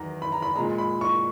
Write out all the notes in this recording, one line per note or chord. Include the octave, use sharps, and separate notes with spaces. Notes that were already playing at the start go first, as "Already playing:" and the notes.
Already playing: E2 D#3 F#3 A#5
B5
A#5
B5
A#2 G#3 A#5
B5
C#6